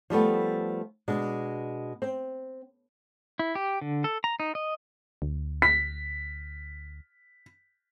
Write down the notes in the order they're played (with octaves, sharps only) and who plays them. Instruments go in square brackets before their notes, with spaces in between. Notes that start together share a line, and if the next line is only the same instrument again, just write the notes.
[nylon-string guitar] F3 G3 A3 B3
B2 G#3 D4
C4
[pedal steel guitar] E4
G4
D3
A4
A#5
D#4
D#5
[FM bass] D2
[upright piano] B6